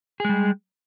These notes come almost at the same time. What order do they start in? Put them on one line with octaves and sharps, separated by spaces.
G#4 G#3 G3